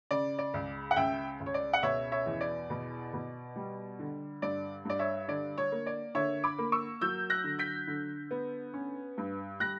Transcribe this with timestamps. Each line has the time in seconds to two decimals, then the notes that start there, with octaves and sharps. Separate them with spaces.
0.11 C#3 D5
0.39 D5
0.54 C#2
0.91 F#5
0.96 C#2 E5 G5
1.40 C#2
1.46 C#5
1.54 D5
1.73 F#5
1.83 B2 C#5 E5
2.12 C#5 E5
2.26 E2
2.41 D5
2.70 B2
3.13 B2
3.56 G3
3.99 D3
4.42 G2 D5
4.85 G2 D5
4.99 C#5 E5
5.28 D3 D5
5.58 C#5
5.72 A#3
5.86 D5
6.15 D3 C#5 E5
6.44 B5 D6
6.58 A#3
6.72 C#6 E6
7.01 F#3 E6 G6
7.30 F#6 A#6
7.44 D3
7.59 G6 B6
7.87 D3
8.31 B3
8.74 C#4
9.18 G2
9.60 G3 F#6 A#6